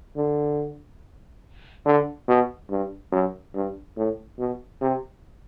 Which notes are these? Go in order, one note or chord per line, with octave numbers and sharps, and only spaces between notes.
D3
D3
B2
G2
F#2
G2
A2
B2
C3